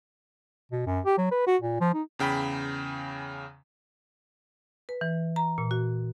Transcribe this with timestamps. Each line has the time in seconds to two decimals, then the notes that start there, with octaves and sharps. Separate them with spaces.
0.72 B2
0.86 F#2
1.05 G4
1.18 F#3
1.31 B4
1.47 F#4
1.62 A#2
1.81 F3
1.94 D#4
2.19 E2 C#3 G5 B5 B6
4.89 B4
5.01 E3
5.36 A#5
5.58 A#2
5.71 F#4